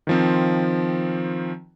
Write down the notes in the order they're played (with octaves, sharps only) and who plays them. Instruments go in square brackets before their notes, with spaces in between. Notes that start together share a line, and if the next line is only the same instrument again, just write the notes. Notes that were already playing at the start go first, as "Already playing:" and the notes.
[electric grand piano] D#3 F3 C4